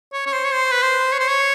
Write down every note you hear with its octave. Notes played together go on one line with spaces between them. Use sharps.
C#5
C#5
C5
C#5
C5
B4
C5
C#5
C5
C#5